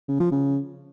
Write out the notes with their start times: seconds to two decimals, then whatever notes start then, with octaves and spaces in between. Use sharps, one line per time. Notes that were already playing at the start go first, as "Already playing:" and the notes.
0.08 C#3
0.20 F3
0.32 C#3